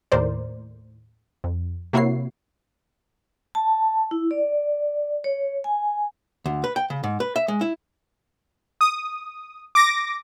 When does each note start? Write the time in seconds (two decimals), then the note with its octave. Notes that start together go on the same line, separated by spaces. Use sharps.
0.12 D#2 A2 A#4 C5 D5
1.44 F2
1.93 C3 A#3 E4 F#4 C#5 C7
3.55 A5
4.11 E4
4.31 D5
5.24 C#5
5.64 G#5
6.46 D2
6.64 B4
6.76 G5
6.90 C#3
7.04 G#2
7.20 B4
7.36 E5
7.48 G#3
7.61 E4
8.81 D#6
9.75 D6 A#6